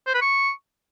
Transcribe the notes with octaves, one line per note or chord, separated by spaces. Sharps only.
C5
B4
C#6